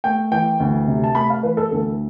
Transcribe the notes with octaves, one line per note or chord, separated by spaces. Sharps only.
A3 G5
E3 G5
D2
C3
A5
A3 B5
F5
E3 B4
A4
D2 A4